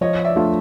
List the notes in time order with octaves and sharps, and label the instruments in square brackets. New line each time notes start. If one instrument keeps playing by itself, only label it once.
[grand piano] F3 [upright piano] C#5 D#5
[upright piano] D5 E5
[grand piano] A3 D4 F4